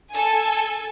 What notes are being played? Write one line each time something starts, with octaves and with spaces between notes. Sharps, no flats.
A4 G#5